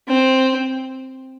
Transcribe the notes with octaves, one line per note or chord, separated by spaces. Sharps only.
C4